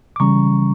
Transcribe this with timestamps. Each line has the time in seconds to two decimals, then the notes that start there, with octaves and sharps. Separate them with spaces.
0.16 D6
0.20 C#3 E3 G3 C#4 A#5 C#6